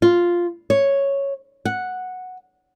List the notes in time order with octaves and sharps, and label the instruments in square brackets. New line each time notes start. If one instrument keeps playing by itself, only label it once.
[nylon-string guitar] F4
C#5
F#5